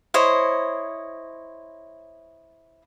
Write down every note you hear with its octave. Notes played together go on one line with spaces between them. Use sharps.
E4 C5 C#5 D#5